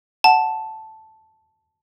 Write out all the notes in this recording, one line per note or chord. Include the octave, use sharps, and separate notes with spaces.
F#5 A5